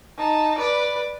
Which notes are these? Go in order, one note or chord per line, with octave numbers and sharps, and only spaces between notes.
D#4 A5
B4 D5